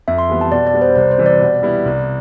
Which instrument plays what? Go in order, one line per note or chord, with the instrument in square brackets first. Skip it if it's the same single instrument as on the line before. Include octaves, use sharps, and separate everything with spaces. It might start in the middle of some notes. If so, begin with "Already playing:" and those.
[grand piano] F2 [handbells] E5
[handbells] C6
[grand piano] E3 G3 B3
[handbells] A5
[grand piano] B2 [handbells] D5
[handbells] D5
[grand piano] G3 B3
[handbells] C5
[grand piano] C2 [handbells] D5
[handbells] C5
[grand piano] C3 E3 G3
[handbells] D5
[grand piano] B2
G3 B3 E4
C2